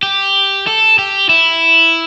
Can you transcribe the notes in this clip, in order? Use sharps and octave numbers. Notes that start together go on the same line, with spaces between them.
G4
A4
G4
E4